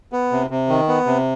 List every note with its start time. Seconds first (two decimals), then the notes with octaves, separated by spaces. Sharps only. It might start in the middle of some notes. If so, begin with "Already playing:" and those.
0.13 B3
0.32 C3
0.50 C3
0.69 D#3
0.88 B3
1.06 C3